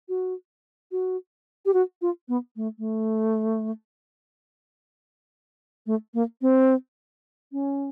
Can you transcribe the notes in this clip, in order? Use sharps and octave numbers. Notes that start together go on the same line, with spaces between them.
F#4
F#4
G4
F#4
F4
B3
A3
A3
A3
A#3
C4
C#4